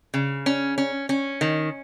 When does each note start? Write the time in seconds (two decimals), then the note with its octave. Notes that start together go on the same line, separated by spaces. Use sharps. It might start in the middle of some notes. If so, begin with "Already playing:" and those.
0.14 C#3
0.46 C#4
0.78 C#4
1.09 C#4
1.41 D#3